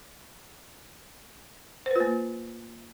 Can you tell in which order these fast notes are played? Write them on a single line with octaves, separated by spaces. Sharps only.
C5 B4 F4 A#3